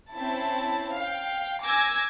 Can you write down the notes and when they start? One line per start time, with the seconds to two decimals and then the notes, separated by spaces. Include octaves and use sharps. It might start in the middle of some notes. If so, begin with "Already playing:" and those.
0.14 C4 C#4 E4 A5
0.96 F5 G5
1.65 G#5 D6 E6 G#6 A#6